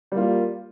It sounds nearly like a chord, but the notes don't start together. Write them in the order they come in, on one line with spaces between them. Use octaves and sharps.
G3 A#3 F4